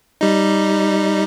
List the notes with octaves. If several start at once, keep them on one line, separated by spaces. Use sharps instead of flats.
G3 D#4